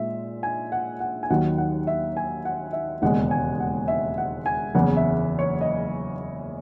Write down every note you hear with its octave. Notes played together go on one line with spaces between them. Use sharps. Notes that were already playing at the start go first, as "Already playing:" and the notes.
Already playing: A#2 G#3 E5
G#5
F#5
F#5
G#5
D#2 D#3 F#3 F#5
F#5
E5
G#5
F#5
E5
E1 D#2 C#3 G#3 F#5
G#5
F#5
E5
F#5
G#5
F#1 E2 C#3 F#5
E5
C#5
D#5